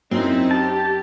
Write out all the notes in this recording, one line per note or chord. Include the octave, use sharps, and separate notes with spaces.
F#2 C4 D#4 E4
G4 A5